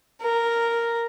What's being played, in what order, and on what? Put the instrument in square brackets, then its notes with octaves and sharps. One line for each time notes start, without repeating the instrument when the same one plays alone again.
[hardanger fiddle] A#4